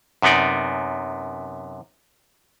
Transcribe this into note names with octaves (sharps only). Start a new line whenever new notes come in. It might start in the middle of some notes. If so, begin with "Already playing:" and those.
F#2 C3 B3 D#4 D5